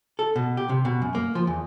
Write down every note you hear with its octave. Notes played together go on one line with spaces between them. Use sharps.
A4
B2
G4
C3
B2
F#2
A#3
F3
E2